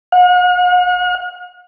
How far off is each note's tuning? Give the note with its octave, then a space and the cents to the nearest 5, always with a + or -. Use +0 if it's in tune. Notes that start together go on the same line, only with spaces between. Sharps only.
F#5 -45